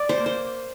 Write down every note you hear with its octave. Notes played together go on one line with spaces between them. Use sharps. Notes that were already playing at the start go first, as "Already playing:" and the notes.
Already playing: D5
C5
A#3
C5